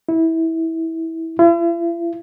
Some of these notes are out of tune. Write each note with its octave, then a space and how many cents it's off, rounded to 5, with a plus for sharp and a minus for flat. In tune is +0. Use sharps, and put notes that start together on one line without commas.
E4 -20
E4 +45